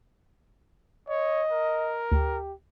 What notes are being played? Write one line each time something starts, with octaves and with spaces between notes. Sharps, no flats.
C#5 D#5
A#4
D2 G4